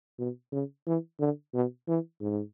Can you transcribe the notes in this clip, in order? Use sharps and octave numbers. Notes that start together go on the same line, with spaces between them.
B2
C#3
E3
D3
B2
E3
G#2